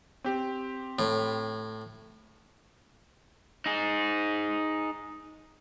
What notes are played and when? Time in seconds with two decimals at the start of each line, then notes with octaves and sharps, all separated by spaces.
0.24 C4 G4
0.99 A2
3.66 D#4 G#4